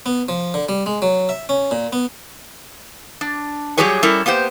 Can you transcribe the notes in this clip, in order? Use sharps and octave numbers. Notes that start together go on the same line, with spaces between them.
B3
F3
D3
G3
G#3
F#3
E5
C#4
A#2
B3
D4
F#3 G3 G4 G#4 B4 C#5
G3 C#4 E4 A4 A#4
A#3 B3 G4 C5